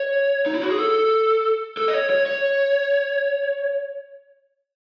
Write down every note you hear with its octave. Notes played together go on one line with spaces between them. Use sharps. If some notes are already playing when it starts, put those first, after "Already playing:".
Already playing: C#5
D#4
E4
F#4
G#4
A4
A4
D#5
C#5
C#5
C#5